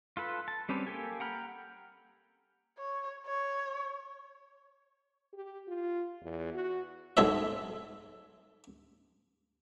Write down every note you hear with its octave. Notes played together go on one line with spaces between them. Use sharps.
F4 A4 B4
A5
G3 C4 C#4 G4 B4
A#3 G4 A4 G#5
F#5 G5 A#5 B5 F6
C#5
C#5
G4
F4
E2
F#4
B1 G#2 A4 C#5 E5